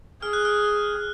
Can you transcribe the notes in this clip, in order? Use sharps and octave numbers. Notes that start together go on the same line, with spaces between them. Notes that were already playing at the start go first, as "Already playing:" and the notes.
G#4 F6
F#6
F6